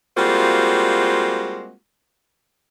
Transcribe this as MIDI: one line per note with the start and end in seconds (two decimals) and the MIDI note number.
0.17 1.73 55
0.17 1.73 56
0.17 1.73 58
0.17 1.73 60
0.17 1.73 65
0.17 1.73 66